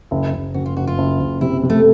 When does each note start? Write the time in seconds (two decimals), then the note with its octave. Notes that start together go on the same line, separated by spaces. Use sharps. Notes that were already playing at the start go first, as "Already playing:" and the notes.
0.11 F#1
0.33 F#1
0.54 F#1 F#4
0.66 F4
0.76 F#1 F#4
0.87 F4
0.98 F#1
1.20 F#1
1.41 C3 E4
1.63 C3
1.70 A3